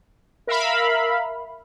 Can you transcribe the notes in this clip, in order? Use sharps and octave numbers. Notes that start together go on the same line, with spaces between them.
A#4 E5 F5 B5